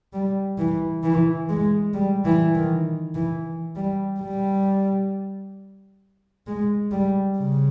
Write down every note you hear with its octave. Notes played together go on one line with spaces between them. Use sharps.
G3
E3
E3
G#3
G3
E3
D#3
E3
G3
G3
G#3
G3
C#3